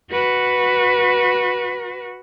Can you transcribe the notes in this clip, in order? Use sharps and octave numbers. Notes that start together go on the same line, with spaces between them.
F#4 B4